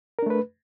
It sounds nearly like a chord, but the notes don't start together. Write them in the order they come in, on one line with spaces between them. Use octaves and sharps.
A#4 D4 A3 B4